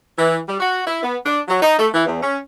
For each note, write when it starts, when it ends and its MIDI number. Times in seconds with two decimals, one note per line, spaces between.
0.18 0.38 52
0.47 0.58 55
0.60 0.81 66
0.86 1.02 64
1.03 1.16 59
1.24 1.39 62
1.47 1.59 54
1.61 1.77 63
1.79 1.88 57
1.93 2.04 52
2.06 2.18 40
2.22 2.37 61